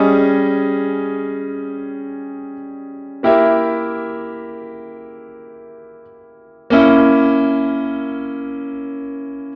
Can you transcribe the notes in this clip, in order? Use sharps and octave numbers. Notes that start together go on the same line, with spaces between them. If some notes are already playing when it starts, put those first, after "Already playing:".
Already playing: G3 C#4 G#4 D#5
A#3 E4 G4 A#4 E5
A#3 C#4 E4